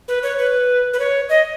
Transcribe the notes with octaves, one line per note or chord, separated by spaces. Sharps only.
B4
C#5
B4
B4
C#5
D#5